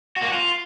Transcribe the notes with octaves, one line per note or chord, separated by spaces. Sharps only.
F#4
A#3
F#4
F4